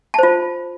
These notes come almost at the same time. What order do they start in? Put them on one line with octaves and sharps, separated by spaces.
A5 C5 F4